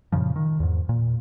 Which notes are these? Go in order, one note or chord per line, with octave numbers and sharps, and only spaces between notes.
F#2 A#2 C#3 F3
D#3
E2 G#2
A#2